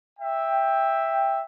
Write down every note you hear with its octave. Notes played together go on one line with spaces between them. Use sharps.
E5 G5